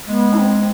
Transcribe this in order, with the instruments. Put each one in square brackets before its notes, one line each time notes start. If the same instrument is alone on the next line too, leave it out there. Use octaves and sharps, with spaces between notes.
[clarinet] G#3 [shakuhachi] B3
[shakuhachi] E4
C4